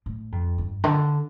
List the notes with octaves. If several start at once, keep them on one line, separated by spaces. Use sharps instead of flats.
A2
F2
G2
D3